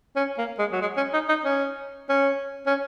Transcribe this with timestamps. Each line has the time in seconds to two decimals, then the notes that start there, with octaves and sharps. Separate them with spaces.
0.16 C#4
0.38 A#3
0.58 G#3
0.72 F#3
0.81 G#3
0.97 C#4
1.13 D#4
1.28 D#4
1.45 C#4
2.09 C#4
2.66 C#4